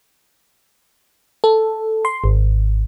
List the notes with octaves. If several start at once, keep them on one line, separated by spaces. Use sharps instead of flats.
A4
C6
G#1